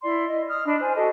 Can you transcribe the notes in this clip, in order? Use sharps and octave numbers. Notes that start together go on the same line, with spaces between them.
E4 D5 C6
D#5
D#6 F6
D4 D#5 B5
C5 G#5
F#4 A4 D#5